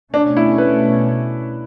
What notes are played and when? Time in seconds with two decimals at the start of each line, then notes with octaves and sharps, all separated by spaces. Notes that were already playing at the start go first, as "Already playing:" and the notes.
0.14 B2 A3 C#4 D4
0.37 E4
0.58 B4